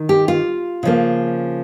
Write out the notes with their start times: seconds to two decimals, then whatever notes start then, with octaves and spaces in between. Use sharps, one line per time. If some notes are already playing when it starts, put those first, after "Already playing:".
Already playing: D#3
0.09 G4
0.28 F4
0.83 C#3 F3 A#3